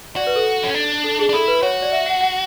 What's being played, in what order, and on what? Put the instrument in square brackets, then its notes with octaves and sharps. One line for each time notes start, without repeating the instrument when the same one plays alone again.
[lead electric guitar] F#4 [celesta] D5
[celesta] B4
A4
[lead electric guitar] C#4
D4
[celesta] A4
G#4
[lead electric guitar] D4
[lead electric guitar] E4 [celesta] A4
[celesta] B4
[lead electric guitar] F#4 [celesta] C#5
[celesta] D5
E5
F#5
F#5